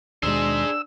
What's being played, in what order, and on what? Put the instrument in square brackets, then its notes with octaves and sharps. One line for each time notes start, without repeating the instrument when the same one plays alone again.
[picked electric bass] D#2 B2 G#3 [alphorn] D4 [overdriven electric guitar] G#4 C5 [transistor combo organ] E6